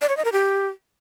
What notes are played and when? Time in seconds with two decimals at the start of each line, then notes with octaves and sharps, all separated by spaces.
0.01 D5
0.09 C#5
0.17 D#5
0.25 A#4
0.32 G4